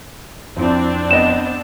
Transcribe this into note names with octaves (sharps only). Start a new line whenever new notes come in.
F2 C4 D4 E4
B3 D#5 E7